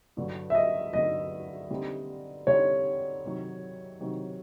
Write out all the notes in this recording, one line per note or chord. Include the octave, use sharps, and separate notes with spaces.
G2 D3 F#3
E5
D#5
G2 D3 F#3 D#5
D3 G3 C4 D#4
D3 G3 C4 D#4 C#5
C3 D#3 F#3
C3 D#3 F#3